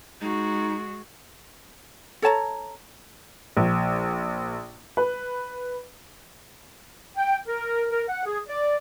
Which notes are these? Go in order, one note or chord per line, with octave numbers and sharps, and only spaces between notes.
G#3 D#4 F#4
A4 C#5 A5 A#5
A#1
B4
G5
A#4
A#4
F#5
G#4
D5